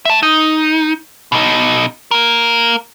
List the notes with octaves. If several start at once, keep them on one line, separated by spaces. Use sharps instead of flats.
E5 A5
D#4
B2 D#4
A#3 A#4